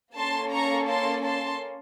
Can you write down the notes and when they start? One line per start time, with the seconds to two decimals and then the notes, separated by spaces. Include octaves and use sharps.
0.16 A#3 C#4 A4 A5 C6
0.53 A#5 C#6
0.89 A5 C6
1.25 A5 C6